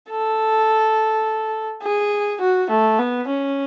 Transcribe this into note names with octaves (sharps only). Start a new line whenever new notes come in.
A4
G#4
F#4
A3
B3
C#4